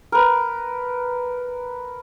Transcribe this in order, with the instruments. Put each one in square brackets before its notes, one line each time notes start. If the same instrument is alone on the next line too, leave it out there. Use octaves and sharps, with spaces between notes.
[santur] A#4 B4